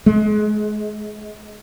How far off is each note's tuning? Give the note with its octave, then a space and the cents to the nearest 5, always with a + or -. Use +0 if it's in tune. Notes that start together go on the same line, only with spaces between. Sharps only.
G#3 +30